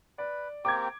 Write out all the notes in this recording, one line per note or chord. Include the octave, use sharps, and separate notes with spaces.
B4 D5
A#3 C4 G4 D6 G#6